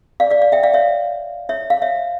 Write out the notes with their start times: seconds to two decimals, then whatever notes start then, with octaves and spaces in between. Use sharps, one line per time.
0.20 D5 F5
0.30 D5 F5
0.42 D5 F5
0.52 E5 G5
0.63 D5 F5
0.74 C#5 E5
1.49 C#5 E5
1.70 F5
1.82 C#5 E5